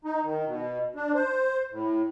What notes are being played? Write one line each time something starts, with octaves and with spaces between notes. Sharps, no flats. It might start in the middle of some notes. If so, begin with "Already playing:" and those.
D#4
D#3
B2
D4
C5
A2